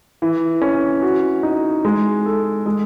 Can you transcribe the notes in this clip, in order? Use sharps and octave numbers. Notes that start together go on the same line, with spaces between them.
E3
C#4
F#4
D#4
G#3
A4
G#3